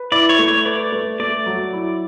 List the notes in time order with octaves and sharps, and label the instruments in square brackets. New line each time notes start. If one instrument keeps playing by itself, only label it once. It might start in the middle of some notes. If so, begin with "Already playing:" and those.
Already playing: [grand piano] B4
[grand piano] E4 [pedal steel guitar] D5
[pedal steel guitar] C#5
[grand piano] A3
[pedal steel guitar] C#5
[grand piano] B4 [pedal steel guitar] D5
[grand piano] A3
[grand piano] A3 [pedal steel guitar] D5
[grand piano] F#3
E4